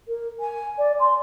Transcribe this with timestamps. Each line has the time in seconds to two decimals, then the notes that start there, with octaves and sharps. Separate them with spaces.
0.08 A#4
0.40 G#5
0.78 D5
0.99 C6